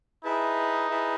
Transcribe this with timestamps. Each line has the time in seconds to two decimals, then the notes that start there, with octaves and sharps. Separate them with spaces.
0.24 D#4 E4 G#4 B4 E5 A5
0.90 E4 G#4 B4 E5 A5